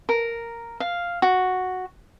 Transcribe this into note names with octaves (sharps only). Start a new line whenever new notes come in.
A#4
F5
F#4